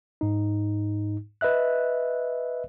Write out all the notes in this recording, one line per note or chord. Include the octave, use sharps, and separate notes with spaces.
G#2 D#4
B4 D#5 E5 F#6